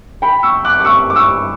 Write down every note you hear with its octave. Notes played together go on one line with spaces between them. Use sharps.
G5 B5
C#6 E6
D6 F#6
D6
C#6 E6
D6
C#6 E6